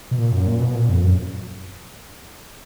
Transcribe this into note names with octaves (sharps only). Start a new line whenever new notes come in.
B2
A#2
F#2
A#2
B2
A#2
F2
F#2